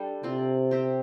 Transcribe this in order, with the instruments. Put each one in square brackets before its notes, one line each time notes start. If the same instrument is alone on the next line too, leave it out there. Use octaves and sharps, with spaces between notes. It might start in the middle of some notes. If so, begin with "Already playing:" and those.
Already playing: [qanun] G3 D4 A4
[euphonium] C3 [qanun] C4 F4 D5
[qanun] C4 G4 C5